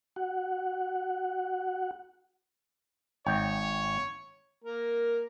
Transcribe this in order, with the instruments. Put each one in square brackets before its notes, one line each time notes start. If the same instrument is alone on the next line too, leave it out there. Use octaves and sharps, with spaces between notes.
[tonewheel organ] F#4 F#5
[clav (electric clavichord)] G#1 G5 [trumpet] C#5
[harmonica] A#3 A#4